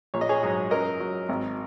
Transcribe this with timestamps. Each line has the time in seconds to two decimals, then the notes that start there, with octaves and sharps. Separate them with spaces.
0.14 A#1 C#5
0.21 D#5
0.29 G#4 C#5
0.43 G#2 F#3
0.71 F#2 A#4 D#5
1.00 F#3
1.29 G#1